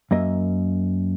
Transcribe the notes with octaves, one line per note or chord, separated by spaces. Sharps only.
F#2 A#3 D#5 E5